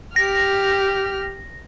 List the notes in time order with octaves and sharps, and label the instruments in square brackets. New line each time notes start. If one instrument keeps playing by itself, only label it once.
[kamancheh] G4 F6 [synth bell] A#6